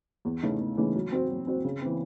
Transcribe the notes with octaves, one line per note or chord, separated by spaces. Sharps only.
E2
C#3 E3 A3 D#4
E2
C#3 E3 A3 D#4
F#3
C4 F#4 C5
F#3
C4 F#4 C5
C#3
E3 C4